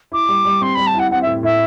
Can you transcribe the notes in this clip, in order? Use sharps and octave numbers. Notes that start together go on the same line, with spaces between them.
E4 D6
G3
G3
C4 C6
G3 B5
A5
E4 F#5
C4 F#5
E5
A2
A2 E5